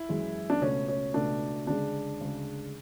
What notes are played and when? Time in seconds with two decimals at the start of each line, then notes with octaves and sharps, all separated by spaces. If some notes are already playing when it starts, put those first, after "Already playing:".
Already playing: E4
0.09 F#2 E3 G#3
0.50 D4
0.61 C#2 B2 A3 C#4
0.88 C#4
1.14 C#2 B2 A3 D4
1.67 D2 C#3 G#3 D4
2.20 D2 C#3 G#3